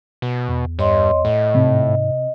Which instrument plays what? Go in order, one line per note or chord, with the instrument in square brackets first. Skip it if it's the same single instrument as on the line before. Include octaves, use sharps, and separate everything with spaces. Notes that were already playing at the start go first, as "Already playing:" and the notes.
[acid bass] B2
[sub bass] E2
[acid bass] G2 [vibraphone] C#5 D#5 C6
[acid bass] A2 [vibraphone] D#5
[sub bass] G#2 [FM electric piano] C3